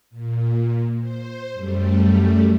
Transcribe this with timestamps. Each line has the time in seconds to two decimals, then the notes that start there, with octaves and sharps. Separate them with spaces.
0.10 A#2
0.99 C5
1.53 F#2 G3 A3